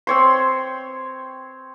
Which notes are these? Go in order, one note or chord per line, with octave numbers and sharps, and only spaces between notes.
C4 C#5 C6